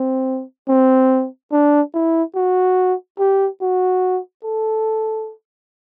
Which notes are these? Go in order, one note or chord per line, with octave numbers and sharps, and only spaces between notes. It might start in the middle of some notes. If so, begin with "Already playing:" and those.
Already playing: C4
C4
D4
E4
F#4
G4
F#4
A4